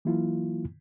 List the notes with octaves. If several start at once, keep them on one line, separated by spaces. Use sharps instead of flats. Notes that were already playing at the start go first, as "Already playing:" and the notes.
E3 F#3 A#3 E4 F4